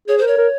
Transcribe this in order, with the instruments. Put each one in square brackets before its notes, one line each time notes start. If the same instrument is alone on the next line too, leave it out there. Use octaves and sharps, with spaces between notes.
[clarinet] G#4 [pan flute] C#5
[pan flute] C5
[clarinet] A#4 [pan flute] C#5
[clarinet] A#4